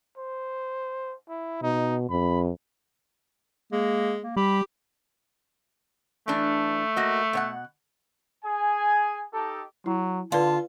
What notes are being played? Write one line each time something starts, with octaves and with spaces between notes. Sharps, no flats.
C5
E4
B2 D#4
F2 B5
G#3 A#3
A#3
G3 G4 B5
E3 A3 D4
A#3 F#4 D#5
B2 C#5 F#5
G#4 G#5
D#4 G4 A4
F#3 E4
D3 F4 B4 D5 F5 A5